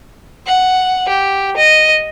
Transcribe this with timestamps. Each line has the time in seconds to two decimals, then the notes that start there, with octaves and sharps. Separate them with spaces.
0.47 F#5
1.08 G4
1.57 D#5